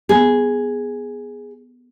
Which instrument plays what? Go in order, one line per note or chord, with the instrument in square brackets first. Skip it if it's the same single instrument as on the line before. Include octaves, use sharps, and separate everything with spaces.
[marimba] B3 [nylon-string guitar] G#4